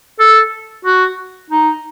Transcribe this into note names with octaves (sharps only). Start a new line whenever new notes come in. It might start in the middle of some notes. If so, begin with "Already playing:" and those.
A4
F#4
D#4